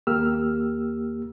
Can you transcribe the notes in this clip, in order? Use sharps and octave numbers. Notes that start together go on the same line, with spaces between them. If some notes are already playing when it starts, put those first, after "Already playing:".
D#2 A#3 G4 E6 F6